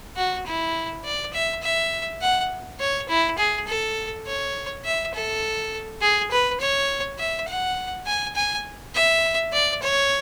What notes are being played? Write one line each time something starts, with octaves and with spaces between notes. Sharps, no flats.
F#4
E4
D5
E5
E5
F#5
C#5
E4
G#4
A4
C#5
E5
A4
G#4
B4
C#5
E5
F#5
G#5
G#5
E5
D5
C#5